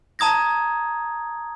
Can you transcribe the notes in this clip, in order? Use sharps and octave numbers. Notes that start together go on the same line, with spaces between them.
A5 A#5 D#6 G#6 A#6